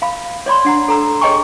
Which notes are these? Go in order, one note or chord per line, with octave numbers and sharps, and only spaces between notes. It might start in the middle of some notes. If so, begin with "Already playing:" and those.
F5 B5
C#5 D5 B5 C6
D4 F#5 A#5
A4 A#5 E6
G#4 C#5 D#5 G5 G#5 C#6